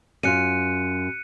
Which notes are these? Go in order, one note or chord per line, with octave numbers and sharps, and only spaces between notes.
F#2 F4 F#6 C#7 D#7